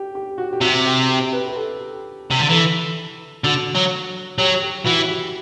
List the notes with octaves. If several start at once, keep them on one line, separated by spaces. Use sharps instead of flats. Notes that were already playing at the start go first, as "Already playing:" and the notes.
Already playing: G4
G4
F#4
G4
C3 F#4
G4
G4
B4
G4
A4
C3
D3
E3 A4
D3 F#4
F#3
F#3 G4
G4
E3 F#4
G4